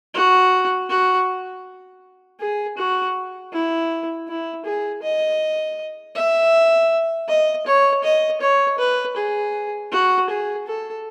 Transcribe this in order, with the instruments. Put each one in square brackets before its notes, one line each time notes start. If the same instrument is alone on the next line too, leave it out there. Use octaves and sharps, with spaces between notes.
[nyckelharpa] F#4
F#4
G#4
F#4
E4
E4
G#4
D#5
E5
D#5
C#5
D#5
C#5
B4
G#4
F#4
G#4
A4